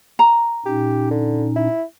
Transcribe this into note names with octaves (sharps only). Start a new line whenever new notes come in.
A#5
A#2 C#4 D#4 G4
D3
E4